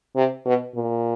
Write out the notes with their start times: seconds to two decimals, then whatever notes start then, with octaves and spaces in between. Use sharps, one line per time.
0.16 C3
0.45 B2
0.76 A#2